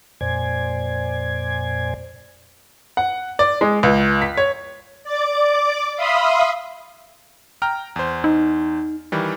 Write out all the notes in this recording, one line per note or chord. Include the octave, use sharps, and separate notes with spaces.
F2 A#2 C5 D5 G#5 G#6
F#5
D5
G#3
C#2
B6
C#5
D5 D6
E5 F5 B5 C6 D#6
G5 A#5 F6
E2 C5
D#4
D#3 E3 G3